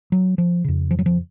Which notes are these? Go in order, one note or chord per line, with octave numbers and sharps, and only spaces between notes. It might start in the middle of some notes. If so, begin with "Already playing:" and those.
F#3
F3
F2 C#3
F3
F#3
F3